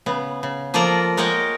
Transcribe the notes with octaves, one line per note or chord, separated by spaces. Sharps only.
C#3 B3
C#3
F3 A#3 F4 A4 D5 A#5
G#3 A#4 C#5 D#5 F#5 G5